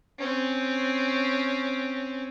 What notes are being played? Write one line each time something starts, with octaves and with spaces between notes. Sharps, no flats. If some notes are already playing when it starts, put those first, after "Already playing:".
C4 C#4